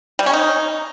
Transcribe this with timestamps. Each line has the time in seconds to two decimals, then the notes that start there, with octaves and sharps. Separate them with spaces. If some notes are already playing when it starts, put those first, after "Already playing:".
0.19 G3
0.26 C#4
0.33 D#4